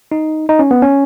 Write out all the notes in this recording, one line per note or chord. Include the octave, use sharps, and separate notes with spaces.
D#4
D#4
C#4
B3
C#4